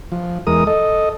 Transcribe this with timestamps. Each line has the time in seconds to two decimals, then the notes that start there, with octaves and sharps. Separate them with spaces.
0.12 F3
0.47 E2 G#3 A#4 D#6
0.67 A4 D#5